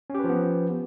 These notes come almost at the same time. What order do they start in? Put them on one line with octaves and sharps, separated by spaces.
C#4 G4 B4 F3 B3